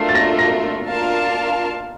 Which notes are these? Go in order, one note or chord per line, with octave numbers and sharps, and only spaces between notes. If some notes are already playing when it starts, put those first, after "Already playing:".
Already playing: A3 D4 F4 A#4 C7
A6
A#6
A#6
D4 F4 A#4 F5 A5